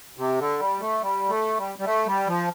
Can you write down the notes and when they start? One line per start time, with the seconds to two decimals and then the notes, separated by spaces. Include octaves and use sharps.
0.17 C3
0.39 D3
0.59 G3
0.80 A3
1.02 G3
1.29 A3
1.58 G3
1.79 G3
1.85 A3
2.06 G3
2.27 F3